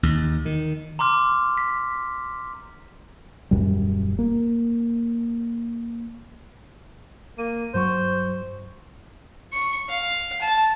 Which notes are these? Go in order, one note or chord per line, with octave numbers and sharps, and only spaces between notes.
D#2
D#3
A#5 C6 D6 F6
B6
D#1 A#1 F#2 G3
A#3
A#3 D#7
G2 F#3 C5 C#6
C#6
F5
A5